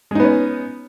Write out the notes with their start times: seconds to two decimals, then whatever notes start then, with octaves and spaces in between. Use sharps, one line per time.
0.11 G#3
0.15 D#4
0.20 B3
0.24 C#4